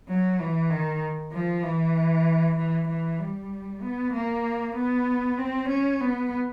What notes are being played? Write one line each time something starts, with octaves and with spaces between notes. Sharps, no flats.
F#3
E3
D#3
F3
E3
E3
E3
G3
B3
A#3
B3
C4
C#4
B3